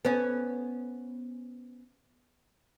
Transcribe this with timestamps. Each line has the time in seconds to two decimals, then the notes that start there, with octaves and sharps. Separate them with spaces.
0.05 B3 C#4